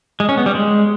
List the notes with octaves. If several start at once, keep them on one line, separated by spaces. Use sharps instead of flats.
G#3
C#4
B3
G3
G#3